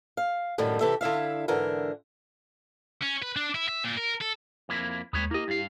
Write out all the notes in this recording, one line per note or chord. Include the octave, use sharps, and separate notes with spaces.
F5
F#2 A2 D3 D#3 G3
C3 E3 G4 A4 E5
D3 E4 E5 F5
G#2 D3 E3 A#4
C#4
B4
D4
E4
E5
A#2
A#4
A4
F2 A#3 E4
D#2 G#3 B3 B4 C#5
A#3 E4 G4 D#5
G2 F5